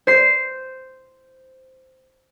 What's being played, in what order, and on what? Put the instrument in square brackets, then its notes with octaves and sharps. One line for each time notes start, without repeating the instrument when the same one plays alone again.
[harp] C5 C7